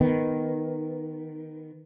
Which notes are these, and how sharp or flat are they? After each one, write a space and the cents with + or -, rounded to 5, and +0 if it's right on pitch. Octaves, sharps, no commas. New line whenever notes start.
D#3 +0 B3 +0